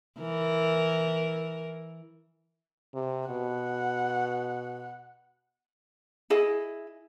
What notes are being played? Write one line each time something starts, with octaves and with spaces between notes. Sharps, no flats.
E3 A#4
C3
B2 F#5
E4 G#4 D#5